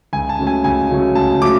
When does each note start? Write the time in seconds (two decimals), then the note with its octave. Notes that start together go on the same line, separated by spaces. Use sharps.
0.13 C#2 G#5
0.29 A5
0.39 C#3 F#3 A3 C#4
0.47 G#5
0.64 C#2 G#5
0.90 C#3 F#3 A3 C#4
1.15 C#2 A5
1.42 C#3 F#3 A3 D6